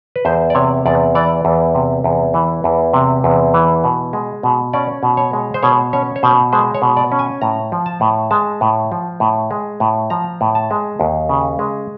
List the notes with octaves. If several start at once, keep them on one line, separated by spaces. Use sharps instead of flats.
B4
E2 C5
D5
C3 C#5
E2 D5
E3 D5
E2
C3
E2
E3
E2
C3
E2
E3
B2
G#3
B2
C#4 D5
B2
C#5
G#3
C5
B2 C#5
C#4 C#5
C#5
B2 C5
G#3 C5
C#5
B2
D5
C#4
G#5
A2 A#5
F3
A5
A2
G#3 A5
A2
F3
A2
G#3
A2
F3 A#5
A2
A5
G#3
D#2
C#3
G#3